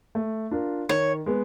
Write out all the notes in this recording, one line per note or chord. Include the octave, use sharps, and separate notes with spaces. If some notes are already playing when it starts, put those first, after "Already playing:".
A3
D4 F4 A#4
D#3 C#5
G#3 B3